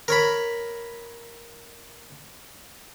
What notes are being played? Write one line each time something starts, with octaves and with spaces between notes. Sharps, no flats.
A#4 C#5 B5